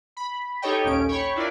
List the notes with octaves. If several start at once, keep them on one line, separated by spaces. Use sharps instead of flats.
B5
D#4 G4 A4 C#5 D#5 G5
A#1 D#2 C#4 D7
C#5 G5 B5 C#6
D4 E4 F4 A#4 D5